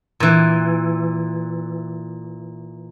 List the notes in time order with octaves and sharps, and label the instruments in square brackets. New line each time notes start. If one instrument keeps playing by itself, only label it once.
[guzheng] A#2 E3